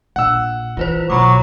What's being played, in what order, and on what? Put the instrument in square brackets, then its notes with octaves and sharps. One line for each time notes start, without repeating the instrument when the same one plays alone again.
[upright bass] A#1 [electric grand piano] F#5 E6
[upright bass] E3 [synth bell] F4 B4 C5
[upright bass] B1 [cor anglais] F#3 [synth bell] A#5 B5 D6